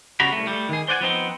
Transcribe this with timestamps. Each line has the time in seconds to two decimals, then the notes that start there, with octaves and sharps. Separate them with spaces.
0.20 C#3 G3 B3 F#4 A#5 B5
0.32 C2 A3
0.47 G3 A3
0.69 D#3 G#4
0.88 C5 D5 F#5 G#5
1.01 F3 B3 C4 D#4